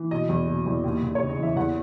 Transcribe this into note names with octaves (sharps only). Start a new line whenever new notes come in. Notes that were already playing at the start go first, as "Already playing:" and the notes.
Already playing: E3
B2 D#5
E2
B2
E2
D#2
D#2
C#5
C#3
D#5
E3 E5
E2 F#5